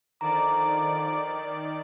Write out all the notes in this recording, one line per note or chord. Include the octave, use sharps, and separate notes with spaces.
D3 D#3 F3 D5 A#5 D6